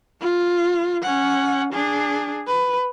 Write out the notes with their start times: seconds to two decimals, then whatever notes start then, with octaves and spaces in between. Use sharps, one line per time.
0.21 F4
1.02 C#4 F#5
1.73 D4 G#4
2.47 B4